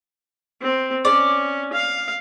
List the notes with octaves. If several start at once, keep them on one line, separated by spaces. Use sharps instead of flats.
C4
C#4 D5
F5